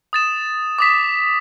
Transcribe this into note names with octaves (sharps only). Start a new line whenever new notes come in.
D#6 A6 E7
D6 D#6 B6